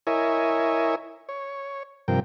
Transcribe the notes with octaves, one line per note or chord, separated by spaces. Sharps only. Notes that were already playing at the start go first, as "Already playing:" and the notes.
E4 A#4 C#5 D#5 E5 G#5
C#5
G2 C3 F3 A#4 G5